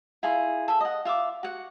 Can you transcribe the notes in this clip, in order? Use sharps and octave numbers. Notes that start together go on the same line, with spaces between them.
E4 F4 G#4
A4 E5
D#5 F#5
F4 E5 F5 D6
F#4 F#5